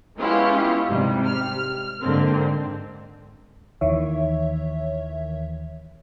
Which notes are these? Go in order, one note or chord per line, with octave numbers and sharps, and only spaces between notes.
G#3 B3 C#4 E4 F4 G4
G#2 C3 G3
F6
G#2 D3 A#3 C4
D#2 D#3 E3 C#5 E5